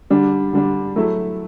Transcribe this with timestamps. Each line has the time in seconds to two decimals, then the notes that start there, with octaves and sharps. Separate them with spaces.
0.10 D3 G3 D4
0.53 D3 G3 D4
0.96 F#3 A3 E4 A4